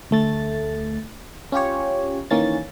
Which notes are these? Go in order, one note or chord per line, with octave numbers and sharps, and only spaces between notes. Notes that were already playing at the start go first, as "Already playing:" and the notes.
D2 A3 A6
C#4 F4 G4 C#5
D#3 E3 A#3 C#4 A6